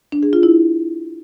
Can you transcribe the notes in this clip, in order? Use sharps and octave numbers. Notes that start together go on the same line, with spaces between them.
D4
G#4
F4
E4